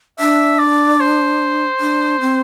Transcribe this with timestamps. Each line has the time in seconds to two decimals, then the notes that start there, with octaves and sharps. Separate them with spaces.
0.19 D4 E5
0.59 D5
1.00 C5
1.80 D4
2.21 C4